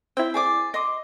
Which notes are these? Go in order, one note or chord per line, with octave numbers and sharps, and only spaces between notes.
C4 E4 G5
G#4 D5 D6
D#5 C6 D6